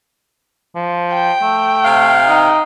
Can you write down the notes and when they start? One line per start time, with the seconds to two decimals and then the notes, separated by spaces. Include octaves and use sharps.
0.75 F3
1.13 G5
1.42 A3
1.85 C3 F5
2.28 D#4